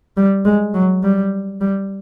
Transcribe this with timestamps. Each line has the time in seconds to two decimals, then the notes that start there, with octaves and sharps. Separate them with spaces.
0.17 G3
0.45 G#3
0.74 F#3
1.03 G3
1.61 G3